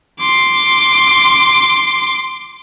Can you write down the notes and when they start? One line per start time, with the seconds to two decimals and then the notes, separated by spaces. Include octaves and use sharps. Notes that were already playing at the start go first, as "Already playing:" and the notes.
0.20 C6 D6